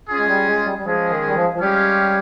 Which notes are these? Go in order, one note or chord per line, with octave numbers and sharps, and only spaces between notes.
C#4 F4 G#4
G#3
G3
G#3
G3
G3
F3 G#3 C#4 G#4
D#3
G3
F3
F3
G3 G#3 C#4 G4 C#5 F5